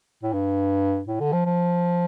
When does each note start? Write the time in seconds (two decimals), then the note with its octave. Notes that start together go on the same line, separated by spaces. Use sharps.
0.23 A2
0.33 G2
1.07 A2
1.20 D3
1.32 F3
1.45 F3